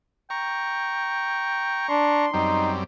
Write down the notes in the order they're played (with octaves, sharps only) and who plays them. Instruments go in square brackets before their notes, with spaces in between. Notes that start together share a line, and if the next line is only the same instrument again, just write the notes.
[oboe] G5 [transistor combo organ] A#5 C#6
[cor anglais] D4 [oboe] C6
[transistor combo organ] F#2 G3 C4 [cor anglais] D#4